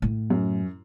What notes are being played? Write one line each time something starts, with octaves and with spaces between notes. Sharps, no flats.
A2
F#2